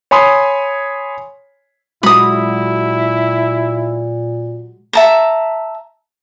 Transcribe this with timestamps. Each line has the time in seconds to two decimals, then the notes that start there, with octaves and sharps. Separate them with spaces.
0.11 C#5 G#5 B5 C6 D#6
2.03 A#2 F#3 G#3 E4 F#4 B5 D#6
4.93 E5 A5 A#5